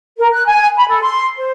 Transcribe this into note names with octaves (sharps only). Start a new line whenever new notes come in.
A#4
F#6
G#5
B5
A4
C6
C5